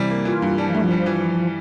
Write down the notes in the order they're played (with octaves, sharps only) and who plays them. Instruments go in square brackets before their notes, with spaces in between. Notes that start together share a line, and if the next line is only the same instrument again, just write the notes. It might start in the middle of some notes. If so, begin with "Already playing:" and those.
Already playing: [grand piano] C3 E3 G3
A#3
[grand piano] E3 [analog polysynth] F4
[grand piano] G2
[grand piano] G3 [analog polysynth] D4
[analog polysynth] F3
[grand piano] G2 [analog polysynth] A3
[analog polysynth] F3
[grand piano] G3
E3